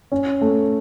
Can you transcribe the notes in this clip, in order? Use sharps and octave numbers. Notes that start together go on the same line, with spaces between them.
C#4
A3